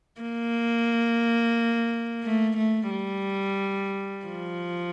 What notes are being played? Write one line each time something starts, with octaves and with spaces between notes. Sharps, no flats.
A#3
A3
A3
G3
F3